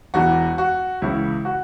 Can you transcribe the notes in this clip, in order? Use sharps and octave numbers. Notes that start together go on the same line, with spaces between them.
E1 E2 E3 F#4
F#4
C#2 C#3 E3 E4
F#4